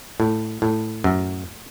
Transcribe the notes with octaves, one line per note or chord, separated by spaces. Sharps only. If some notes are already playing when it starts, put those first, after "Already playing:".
A2
A2
F#2